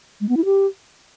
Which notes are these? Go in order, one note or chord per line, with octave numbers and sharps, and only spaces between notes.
G#3
B3
E4
G4